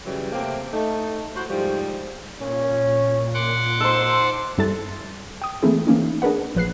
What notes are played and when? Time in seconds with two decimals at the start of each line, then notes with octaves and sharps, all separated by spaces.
0.05 C#3 E3 F#3 G3
0.32 C3 A3 A#3 C4
0.73 A3 D#4
1.35 E4 F#4 C5
1.49 G#2 F3 G3
2.41 A#2 C#4
3.34 F#5 C6 D6
3.80 D#4 A4 C5
4.58 G2 G3 E4 A4 A5 A6
5.42 G5 D#6
5.63 E3 A3 A#3 C4 E4 G#4
5.87 E3 A#3 C#4 D#4
6.22 D4 G#4 A#4 B4 F#5
6.55 A#1 F3 B4 F#6 C7